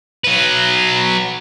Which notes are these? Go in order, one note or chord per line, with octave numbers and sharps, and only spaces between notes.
F#3 B4